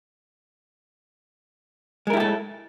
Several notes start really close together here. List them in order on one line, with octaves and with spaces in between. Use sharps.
G#3 A#4 E4 G4 A4